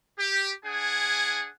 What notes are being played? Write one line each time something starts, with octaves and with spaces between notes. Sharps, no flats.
G4
D4 G#4 F#5 G#5